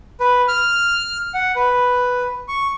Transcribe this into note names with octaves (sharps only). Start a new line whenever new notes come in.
B4
F6
F#5
B4
C#6